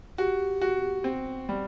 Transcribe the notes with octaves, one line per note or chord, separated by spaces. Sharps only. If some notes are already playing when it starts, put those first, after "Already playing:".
F#4 G4
F#4
C4
G3